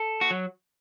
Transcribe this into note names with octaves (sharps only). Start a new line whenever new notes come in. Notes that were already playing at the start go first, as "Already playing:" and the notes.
Already playing: A4
F#4
F#3